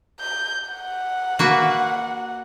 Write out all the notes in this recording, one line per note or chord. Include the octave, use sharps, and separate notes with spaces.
G6
F#5
A#3 F#4 B4